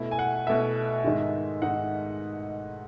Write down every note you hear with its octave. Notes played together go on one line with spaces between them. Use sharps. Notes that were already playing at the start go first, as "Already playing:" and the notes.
Already playing: B2 A3 E4
G#5
F#5
B2 A3 E4 E5
G#2 D#3 G#3 D#4
G#2 D#3 G#3 D#4 F#5